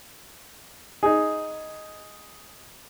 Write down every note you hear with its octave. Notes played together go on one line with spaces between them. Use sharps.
D#4 G#4